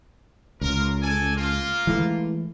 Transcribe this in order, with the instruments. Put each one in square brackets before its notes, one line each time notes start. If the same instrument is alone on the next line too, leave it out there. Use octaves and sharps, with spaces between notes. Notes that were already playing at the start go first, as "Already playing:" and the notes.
[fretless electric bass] C#2 [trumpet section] F4 A#4
[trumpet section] A4 D5 G#5
A#3 F4
[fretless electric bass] E3 G#3 A3